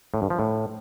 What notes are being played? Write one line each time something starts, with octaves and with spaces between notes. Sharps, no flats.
A2
G2
F3
A2